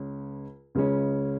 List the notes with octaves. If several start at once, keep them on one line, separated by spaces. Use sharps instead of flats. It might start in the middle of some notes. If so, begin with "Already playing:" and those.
Already playing: C#2 C#3 G#3 C#4
C#2 C#3 G#3 C#4